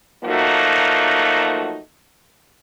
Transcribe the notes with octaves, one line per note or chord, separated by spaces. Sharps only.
F3 F#3 A3 A#3 D#4 F#4